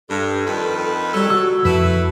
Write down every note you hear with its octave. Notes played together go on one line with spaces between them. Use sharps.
G2 A4
F2 D#3 B4
F#3 G3 A4
F#4 E6
F2 A3 E4 B4